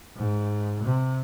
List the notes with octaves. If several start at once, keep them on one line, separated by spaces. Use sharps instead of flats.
G#2
C3